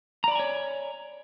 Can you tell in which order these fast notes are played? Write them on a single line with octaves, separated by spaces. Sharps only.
A#5 D5 B5 G#5 C#5